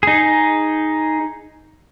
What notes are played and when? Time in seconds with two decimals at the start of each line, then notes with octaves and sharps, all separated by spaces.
0.03 D#4 G#4